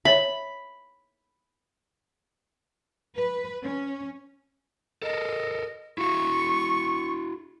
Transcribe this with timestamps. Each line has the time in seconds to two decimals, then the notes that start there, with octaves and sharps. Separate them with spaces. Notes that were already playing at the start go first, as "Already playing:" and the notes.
0.05 C#5 E5 B5
3.17 B4
3.61 C#4
5.02 A4 A#4 D#5
5.98 E4 F#4 C#6